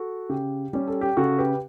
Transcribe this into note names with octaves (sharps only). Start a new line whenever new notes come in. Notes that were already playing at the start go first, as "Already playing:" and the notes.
Already playing: F#4 A4
C#3 G4
G3 C#4 G4
A4
G4
C#3 F#4 A4
G4 B4